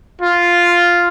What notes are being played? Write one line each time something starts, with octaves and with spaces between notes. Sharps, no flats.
F4